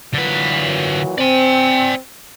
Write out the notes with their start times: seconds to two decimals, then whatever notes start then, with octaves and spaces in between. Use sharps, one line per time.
0.14 A#2 D3 E3 F#3 B4
1.18 C4 D5 G#5